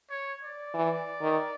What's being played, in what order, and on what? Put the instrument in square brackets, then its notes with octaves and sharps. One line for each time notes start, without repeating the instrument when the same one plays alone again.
[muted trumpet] C#5
D5
[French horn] E3
D#3